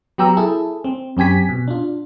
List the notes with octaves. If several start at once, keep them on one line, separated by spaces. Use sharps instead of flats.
F#3 B3 G4 G5 A#5 E6
E4 G#4 A4
C4
F#2 C4 G4 G#5 B6
B2
D4 F4